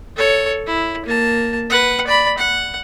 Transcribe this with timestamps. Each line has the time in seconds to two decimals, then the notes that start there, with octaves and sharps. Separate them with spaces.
0.16 A4 C#5
0.67 E4
1.06 A#3 A5
1.70 B4 F#5
2.07 D5 B5
2.38 F#5